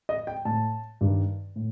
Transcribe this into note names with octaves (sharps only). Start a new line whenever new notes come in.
D#5
G5
A2 A5
G2 D#3
A2